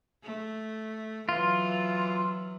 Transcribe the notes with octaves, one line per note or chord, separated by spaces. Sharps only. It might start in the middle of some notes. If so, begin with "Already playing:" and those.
A3
E3 F#3 F4